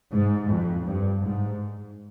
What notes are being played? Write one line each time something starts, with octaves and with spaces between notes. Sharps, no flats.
G#2
F2
G2
G#2